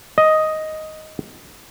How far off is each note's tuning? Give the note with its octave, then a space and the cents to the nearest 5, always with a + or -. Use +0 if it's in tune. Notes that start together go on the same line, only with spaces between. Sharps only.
D#5 +5